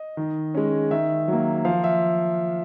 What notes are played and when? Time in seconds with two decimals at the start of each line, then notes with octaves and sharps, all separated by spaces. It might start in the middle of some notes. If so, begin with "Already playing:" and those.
Already playing: D#5
0.17 D#3
0.55 G#3 C#4
0.91 D#3 E5
1.28 F#3 A#3
1.65 F3 F5
1.84 E5